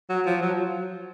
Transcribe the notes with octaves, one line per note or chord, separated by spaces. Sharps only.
F#3
F3
F#3